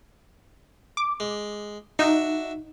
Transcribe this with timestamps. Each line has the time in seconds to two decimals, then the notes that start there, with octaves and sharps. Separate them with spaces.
0.97 D6
1.20 G#3
1.99 D4 D#4 F#4 E5